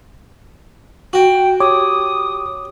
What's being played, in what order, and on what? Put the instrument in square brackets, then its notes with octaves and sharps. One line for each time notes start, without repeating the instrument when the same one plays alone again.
[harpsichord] F#4 [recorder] G5
[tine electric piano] G4 C#5 [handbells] D6 [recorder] D#6